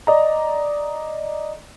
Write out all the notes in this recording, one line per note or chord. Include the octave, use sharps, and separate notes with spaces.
D5 D#5 A#5